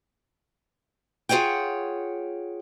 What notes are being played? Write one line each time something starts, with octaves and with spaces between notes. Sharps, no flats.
F4 G#4 C#5 F#5 G5